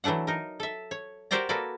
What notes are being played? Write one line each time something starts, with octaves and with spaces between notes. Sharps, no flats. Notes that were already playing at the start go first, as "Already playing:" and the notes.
E3 F#3 A3 D4 F#5
D#4 A#4
A4 E5
C#5
F#4 G4 A#4 C5 D5 A#5
A#3 F#4 A4 B4 D5